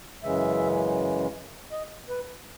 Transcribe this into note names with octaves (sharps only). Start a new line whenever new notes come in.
F#2 C#3 E3 G#3 E5
D#5
B4